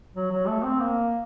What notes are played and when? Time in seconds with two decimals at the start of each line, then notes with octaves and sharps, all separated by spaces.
0.16 F#3
0.32 F#3
0.48 A3
0.64 C4
0.80 A#3